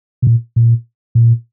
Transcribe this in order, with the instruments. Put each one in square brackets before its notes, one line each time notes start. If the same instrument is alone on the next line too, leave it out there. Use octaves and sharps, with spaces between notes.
[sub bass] B2
A#2
A#2
A#2